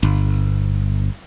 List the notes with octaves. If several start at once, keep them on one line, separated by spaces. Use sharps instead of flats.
G1